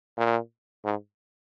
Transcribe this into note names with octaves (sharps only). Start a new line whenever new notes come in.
A#2
G#2